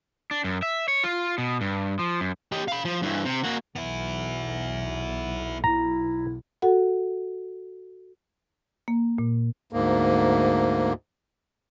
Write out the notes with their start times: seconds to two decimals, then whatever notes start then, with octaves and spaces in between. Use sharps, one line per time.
0.31 D4
0.44 F#2
0.62 E5
0.88 C#5
1.04 F4
1.38 B2
1.61 G2
1.99 F3
2.20 F#2
2.52 G4 D#5
2.68 F5 B5
2.85 F3
3.02 G2 E3
3.25 C3
3.44 A#3 F#4
3.76 B1 B3 E4
5.64 E4 A#5
6.62 F#4 A4 F#5
8.88 A#3
9.18 A#2
9.73 D2 G#2 A#3